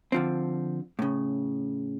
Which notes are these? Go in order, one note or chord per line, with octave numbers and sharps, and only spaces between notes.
D3 F3 C4
A2 C#3